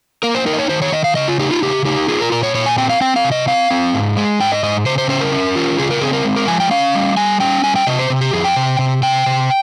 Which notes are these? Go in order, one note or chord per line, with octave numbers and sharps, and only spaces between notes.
A#3 A#4
C5
D#4 A#4
D#5
C#5
D#3 C5
C#5
D#3 D#5
F5
C#3 D#5
F4
D#4 G4
F4
C#3 G4
D#4 G4
F4 G#4
A#4
A#2 A#4
C#5
A#2 C#5
G#5
C4 G5
F5
C4 G5
F5
C3
D#5
C4 F5
C4
G#2
G#3
G#2 G5
D#5
G#2 D#5
C#3 C5
C5
C#4 C5
A#4
C#4
F4
C#3 G#4
A#4
C4 G#4
A#4
G#3
A#4
F3 G#5
G5
C#4 F5
G3
G3 G#5
C#4 G5
G3 G#5
G5
C3 D#5
C5
C3
G4
F2 G#4
G5
C3
C3
C3 G5
C3